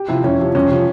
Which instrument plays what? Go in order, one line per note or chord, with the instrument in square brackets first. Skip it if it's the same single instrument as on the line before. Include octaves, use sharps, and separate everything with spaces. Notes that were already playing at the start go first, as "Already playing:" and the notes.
Already playing: [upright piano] G4
[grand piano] C3 F3 [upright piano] E4
[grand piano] F2 [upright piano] C#4
[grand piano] C3 F3
[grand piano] F2 [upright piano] C#4
[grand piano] C3 F3